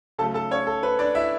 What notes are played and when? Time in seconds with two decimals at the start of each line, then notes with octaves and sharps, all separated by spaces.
0.19 C#3 F#3 A3 A4 A5
0.34 A4 A5
0.51 C#4 C#5
0.67 A4
0.83 B4
0.99 D4 D5
1.15 E4 E5